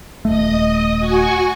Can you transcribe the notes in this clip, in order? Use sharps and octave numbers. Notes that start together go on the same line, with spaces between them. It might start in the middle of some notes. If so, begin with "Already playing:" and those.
D#1 G#1 A3 D#5 D#6
F#4 G#5 C#6